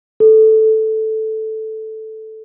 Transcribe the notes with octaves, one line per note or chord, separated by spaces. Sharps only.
A4